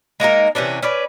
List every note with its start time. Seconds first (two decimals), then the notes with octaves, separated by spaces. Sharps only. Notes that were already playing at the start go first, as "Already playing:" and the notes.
0.20 G#3 A#3 D#4 A#4
0.55 C3 E3 C#4 D4
0.83 C#4 B4 D5